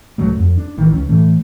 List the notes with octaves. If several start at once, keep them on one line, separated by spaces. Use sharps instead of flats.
D1 C#2 F#3 A3
F2
D4
A1 D#3 E3
C#2 C#4
A2 E3 A3